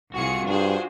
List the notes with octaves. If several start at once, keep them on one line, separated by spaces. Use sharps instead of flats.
C2 F4 F#4 G#4 C#7
G2 D4 G#4 C5